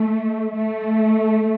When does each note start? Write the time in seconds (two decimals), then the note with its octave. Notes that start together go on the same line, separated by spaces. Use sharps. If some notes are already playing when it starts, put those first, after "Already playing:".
Already playing: A3
0.55 A3